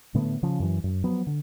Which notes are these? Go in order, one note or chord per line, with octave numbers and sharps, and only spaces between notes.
A2 D3 A3 B3
C#3 F3 C#4
F#2 E3
F#2
F3 F#3 B3
D3